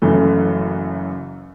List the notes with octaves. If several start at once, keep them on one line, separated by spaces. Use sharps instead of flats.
F#1 F#2 E3 A3